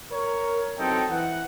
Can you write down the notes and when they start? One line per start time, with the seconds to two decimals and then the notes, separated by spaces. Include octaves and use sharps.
0.12 A#4 C#5
0.79 E2 F#3 C4 D#4 A4 G5
1.10 E3 F#5